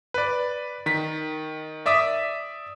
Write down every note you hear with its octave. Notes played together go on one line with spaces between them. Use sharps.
B4 D5
D#3 B6
D5 E5 D6 D#6 B6